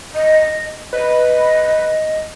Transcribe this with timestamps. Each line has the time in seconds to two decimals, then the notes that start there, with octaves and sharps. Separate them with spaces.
0.15 D#5
0.93 B4 D#5